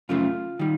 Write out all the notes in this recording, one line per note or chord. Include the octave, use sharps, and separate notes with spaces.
F#2 C#3 F3 A3 F4
D#3 G3